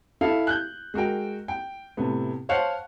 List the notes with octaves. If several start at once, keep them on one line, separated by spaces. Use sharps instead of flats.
E4 A4 F5
F#6 G6
G#3 F#4 A#4 G5
G5
A2 C3 A3 B3
C5 C#5 F5 F#5 A5